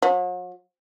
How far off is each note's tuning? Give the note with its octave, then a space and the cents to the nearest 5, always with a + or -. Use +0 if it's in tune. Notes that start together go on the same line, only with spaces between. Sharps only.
F#3 -45